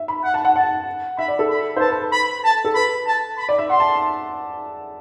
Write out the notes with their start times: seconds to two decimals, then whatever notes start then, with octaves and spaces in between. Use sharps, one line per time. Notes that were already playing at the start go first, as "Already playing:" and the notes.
Already playing: E5
0.08 B5
0.24 F#5
0.34 A5
0.45 F#5
0.55 F#5 A5
1.18 E5 B5
1.28 D5
1.39 A4
1.50 B5
1.76 C5
1.80 B4 A5
1.91 B4
2.02 B4
2.12 B5
2.44 A5
2.65 A4
2.75 B4 B5
3.07 A5
3.38 B5
3.49 D5
3.58 E5
3.69 F#5 C6
3.80 A5